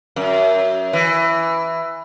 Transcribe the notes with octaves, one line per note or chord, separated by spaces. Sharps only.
F#2
E3